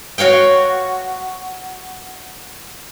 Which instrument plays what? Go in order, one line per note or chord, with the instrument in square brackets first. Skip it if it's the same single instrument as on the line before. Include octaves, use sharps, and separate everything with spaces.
[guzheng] F#4 C#5 F5 G5